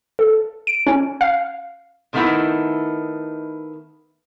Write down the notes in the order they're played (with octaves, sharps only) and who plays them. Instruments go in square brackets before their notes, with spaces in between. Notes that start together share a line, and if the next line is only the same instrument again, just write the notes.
[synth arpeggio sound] A4
D7
C#4
F5
[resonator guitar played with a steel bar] C3 D#3 A3 B3 D#4 E4